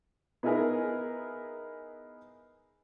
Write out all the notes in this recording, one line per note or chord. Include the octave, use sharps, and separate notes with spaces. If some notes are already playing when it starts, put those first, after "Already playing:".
B3 D#4 E4 G#4 A#4 B4